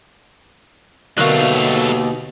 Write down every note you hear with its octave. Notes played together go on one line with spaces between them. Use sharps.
D#2 B2 D3 F#3 A3 A#4 F5 C#6